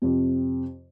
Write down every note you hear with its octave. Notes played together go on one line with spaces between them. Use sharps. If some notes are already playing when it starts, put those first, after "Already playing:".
F2 C3